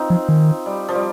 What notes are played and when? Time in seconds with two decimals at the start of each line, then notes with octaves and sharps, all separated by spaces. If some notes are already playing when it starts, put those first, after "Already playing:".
Already playing: C4 D#4 F4
0.10 F3
0.29 D#3
0.66 G3
0.88 F3
0.95 G3